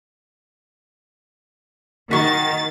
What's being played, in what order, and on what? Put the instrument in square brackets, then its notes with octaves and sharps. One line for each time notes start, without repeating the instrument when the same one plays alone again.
[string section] D#3 A6 [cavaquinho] F#4 C#6